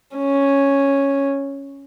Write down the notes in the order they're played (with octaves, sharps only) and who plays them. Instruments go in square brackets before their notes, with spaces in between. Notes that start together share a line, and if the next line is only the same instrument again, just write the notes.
[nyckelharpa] C#4